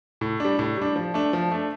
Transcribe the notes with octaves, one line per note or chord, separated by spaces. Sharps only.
A2
G3 D4
A2
G3 D4
F3
A3 D4
F3
A3 D4